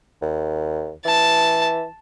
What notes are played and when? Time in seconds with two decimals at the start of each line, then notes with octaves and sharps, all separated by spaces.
0.22 D#2
1.05 E3 A5